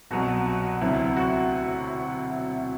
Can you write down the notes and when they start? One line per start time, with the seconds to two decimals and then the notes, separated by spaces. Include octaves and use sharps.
0.11 C2 B2 F#3 F#4
0.46 F#4
0.81 D2 C3 F#3 E4
1.17 F#4